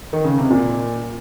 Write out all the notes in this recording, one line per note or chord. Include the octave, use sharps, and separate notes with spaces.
D#3
C#3
C3
A#2